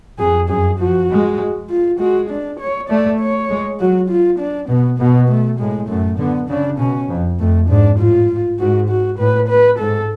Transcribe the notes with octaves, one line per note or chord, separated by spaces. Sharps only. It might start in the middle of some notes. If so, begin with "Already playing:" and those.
F2 G#4
F#2 G#4
F3 F#4
G#3
F4
G#3 F#4
D4
C#5
A3 D5
C#5
G#3
F#3 F#4
F4
D4
B2 B3
B2 B3
A3
A2 G#3
F#2 A3
D3 B3
C#3 D4
B2 C#4
F2
F2 A3
G#2 D4
A2 F4
G#2 F#4
F#4
A2 B4
B4
G#2 A4